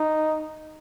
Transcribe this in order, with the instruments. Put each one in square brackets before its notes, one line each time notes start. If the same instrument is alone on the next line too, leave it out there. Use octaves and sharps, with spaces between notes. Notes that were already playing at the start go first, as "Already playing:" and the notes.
Already playing: [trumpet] D#4